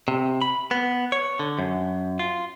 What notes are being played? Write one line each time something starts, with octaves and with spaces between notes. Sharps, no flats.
C3
B5
B3
C#5
D3
F#2
F4